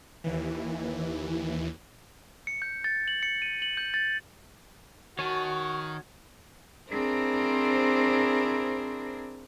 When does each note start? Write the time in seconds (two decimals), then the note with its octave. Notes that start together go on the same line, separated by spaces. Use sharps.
0.24 D#2 E3
2.47 C#7
2.62 G6
2.84 A6
3.08 F#7
3.23 C#7
3.42 D#7
3.62 F#7
3.77 G6
3.94 A6
5.19 D#3 F#4 C#5 G#5 A5 C#6
6.90 C4 D4 E4 G#4 A#4 C5